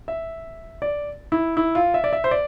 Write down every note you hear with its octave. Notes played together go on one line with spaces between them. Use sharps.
E5
D5
E4
E4
F4
E5
D5
E5
C5
D5